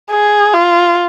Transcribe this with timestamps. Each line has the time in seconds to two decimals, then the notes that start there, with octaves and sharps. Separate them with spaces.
0.11 G#4
0.53 F4